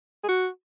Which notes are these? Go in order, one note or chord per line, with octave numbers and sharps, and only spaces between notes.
G#4
F#4